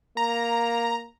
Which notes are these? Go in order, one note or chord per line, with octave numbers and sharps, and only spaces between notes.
A#3 A#5